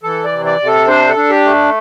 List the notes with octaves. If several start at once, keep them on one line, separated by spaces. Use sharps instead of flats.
E3 A4
D5
C3
D5
C3
A4
D4 C5
A4
D4
G4
A3